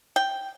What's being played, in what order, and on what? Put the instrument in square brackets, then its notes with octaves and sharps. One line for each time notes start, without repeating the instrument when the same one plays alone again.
[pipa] G5